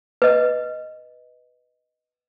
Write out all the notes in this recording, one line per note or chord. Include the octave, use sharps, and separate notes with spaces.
B4 D#5